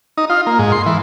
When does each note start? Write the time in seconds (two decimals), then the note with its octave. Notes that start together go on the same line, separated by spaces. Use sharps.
0.18 D#4
0.30 F4
0.47 A#3
0.59 G#2
0.72 C6
0.86 E3